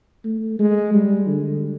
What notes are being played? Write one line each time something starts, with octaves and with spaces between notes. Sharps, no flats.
A3
G#3
G3
D3